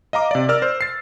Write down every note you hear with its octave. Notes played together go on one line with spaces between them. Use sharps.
D#5 F5 A#5 D6
C3 D5
A#4 D5 E6 F6
C5
A6 C7